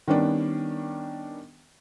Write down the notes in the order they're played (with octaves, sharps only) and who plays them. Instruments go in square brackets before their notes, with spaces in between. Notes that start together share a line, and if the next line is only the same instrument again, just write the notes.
[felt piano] D#3 G3 B3 C#4 D4